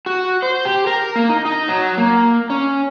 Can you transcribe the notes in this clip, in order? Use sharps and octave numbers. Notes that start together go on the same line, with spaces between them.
F#4
C5
G4
A#4
A#3
D#4
D#4
F#3
A#3
C#4